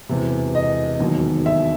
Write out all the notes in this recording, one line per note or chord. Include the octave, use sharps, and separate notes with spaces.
E1 E2 C3
D#5
E1 D#2 D#3 F#3
E5